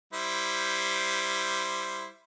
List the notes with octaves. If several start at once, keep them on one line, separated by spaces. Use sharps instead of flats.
G3 E4 C5